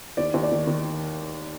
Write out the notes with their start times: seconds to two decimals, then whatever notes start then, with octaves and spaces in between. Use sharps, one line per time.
0.17 D#2 D5
0.34 D#2
0.43 D5
0.52 D#3
0.67 D#3